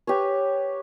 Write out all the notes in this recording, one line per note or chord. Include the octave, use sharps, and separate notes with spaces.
G4 B4 C#5